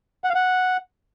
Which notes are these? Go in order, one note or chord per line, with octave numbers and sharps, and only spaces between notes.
F#5
F5
F#5